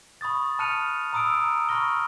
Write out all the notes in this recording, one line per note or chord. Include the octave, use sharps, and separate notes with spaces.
B5 C#6 D#6 A6
A5 F6 F#6 C#7 D#7 F7
A#5 B5 D#6 E6 D7
B5 C#6 F6 A#6 G7